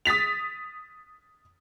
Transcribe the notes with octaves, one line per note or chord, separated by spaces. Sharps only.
D#6 A6 B6 F7